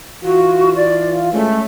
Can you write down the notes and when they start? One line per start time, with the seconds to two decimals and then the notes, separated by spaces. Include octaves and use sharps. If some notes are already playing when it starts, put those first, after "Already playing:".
0.24 E3 F4 F#4
0.75 D5
1.33 G#3 A3 C#4